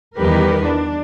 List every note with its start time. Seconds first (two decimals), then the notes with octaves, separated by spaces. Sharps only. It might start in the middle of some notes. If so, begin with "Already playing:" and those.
0.18 E2 D#3 G3 G4 A#4 B4
0.64 D4